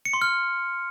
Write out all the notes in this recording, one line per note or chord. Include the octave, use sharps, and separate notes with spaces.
C#7
C6
F6